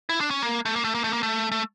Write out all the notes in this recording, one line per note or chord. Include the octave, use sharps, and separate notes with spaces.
E4
D4
C#4
A#3
A3
A#3
A3
A#3
A3
A#3
A3
A3